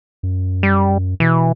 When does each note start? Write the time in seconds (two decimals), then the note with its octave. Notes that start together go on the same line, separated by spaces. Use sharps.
0.23 F#2
0.63 G3
1.20 B2 E3